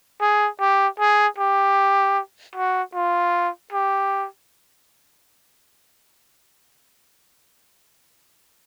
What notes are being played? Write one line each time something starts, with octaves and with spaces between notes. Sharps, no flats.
G#4
G4
G#4
G4
F#4
F4
G4